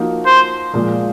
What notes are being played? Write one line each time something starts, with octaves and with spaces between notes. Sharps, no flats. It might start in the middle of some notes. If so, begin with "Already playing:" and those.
Already playing: F3 A#3 D#4 F#4
C5
A#2 F3 G#3